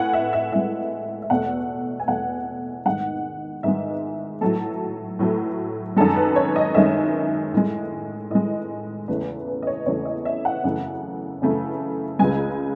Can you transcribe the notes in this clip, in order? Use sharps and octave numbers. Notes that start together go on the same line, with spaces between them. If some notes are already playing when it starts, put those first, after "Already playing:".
Already playing: A2 F#5 G#5
E5
E5
A2 G#3 E5
E5
E2 B2 A3 F#5
G#5
E2 B2 A3 F#5
G#2 D#3 G#3 F#5
G#2 D#3 G#3 E5
A2 F#3 A3 A4
A2 F#3 A3
F#2 D#3 G#3 A4
B4
C#5
D#5
F#2 D#3 G#3 E5
A2 G#3
A2 G#3 D#5
E2 C#3 E3 A3 B4
B4
D#5
C#5
E2 C#3 E3 A3 C#5
D#5
E5
F#5
F#2 C#3 E3 A3
F#2 C#3 E3 A3
C#2 C#3 G#3 G#5